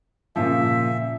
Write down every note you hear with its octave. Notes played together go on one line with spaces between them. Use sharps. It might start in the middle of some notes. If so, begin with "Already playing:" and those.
A#2 C#3 F3 E5